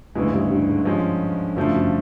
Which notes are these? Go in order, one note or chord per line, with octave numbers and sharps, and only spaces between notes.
D2 G2 C#3 E3 G#3
G2
G2
G#2
F3 G#3 C#4
F#2 C#3 F3 A3 D4
G2
F#2